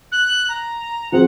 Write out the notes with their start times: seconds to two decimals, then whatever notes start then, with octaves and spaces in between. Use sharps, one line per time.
0.12 F#6
0.49 A#5
1.12 F3 C4 G#4 F#5